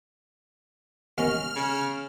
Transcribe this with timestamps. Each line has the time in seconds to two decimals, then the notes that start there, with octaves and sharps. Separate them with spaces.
1.18 D#2 C#4 A#5 F6
1.55 C#3